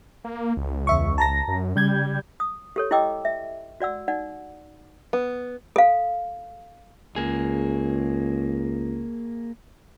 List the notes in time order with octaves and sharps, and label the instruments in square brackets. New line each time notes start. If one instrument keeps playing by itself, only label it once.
[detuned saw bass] A#3
C#2
[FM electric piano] E2 E5 C#6
A5 A#5 A#6
[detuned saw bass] F#2
[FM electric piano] C#3 G6 G#6 [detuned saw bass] G3
[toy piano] D#6
G4 A4 C#5
E4 G4 D#5 G5 D6 E6
E5
F#4 D5 F#5 E6
D#4 D5 F#5
[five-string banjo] B3
[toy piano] A4 F5
[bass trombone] C#2 [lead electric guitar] A#3 G#4